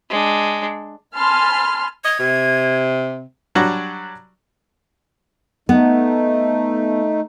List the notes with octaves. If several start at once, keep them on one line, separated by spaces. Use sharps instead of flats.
G#3 D4
G#5 A5 B5 C6 F6
D#5 G#6
C3
F#3 G3 D4 F#4
A3 B3 D#4